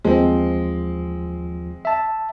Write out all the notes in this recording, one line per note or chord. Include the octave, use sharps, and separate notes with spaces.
D#2 F3 G#3 C4
E5 A5